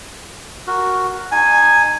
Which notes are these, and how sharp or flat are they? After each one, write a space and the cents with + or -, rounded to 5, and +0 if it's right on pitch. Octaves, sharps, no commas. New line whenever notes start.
F#4 +0 A#4 +0
D#4 -30 G#5 +0